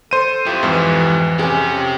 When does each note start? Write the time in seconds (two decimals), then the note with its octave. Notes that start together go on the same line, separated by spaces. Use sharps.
0.11 A4 C5 D#7
0.46 F2 E4 G4
0.63 F2 G#2 E3
1.39 C4 C#4 G4 G#4